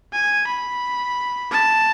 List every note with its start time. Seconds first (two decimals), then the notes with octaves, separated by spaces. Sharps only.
0.13 G#5
0.48 B5
1.51 A5